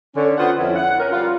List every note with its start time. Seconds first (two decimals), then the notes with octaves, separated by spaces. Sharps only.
0.16 D3 C#4
0.38 B3 F4 C5 F#5
0.57 F2 C#4 E4
0.76 F#5
0.98 C#4 A#4
1.12 G3 F4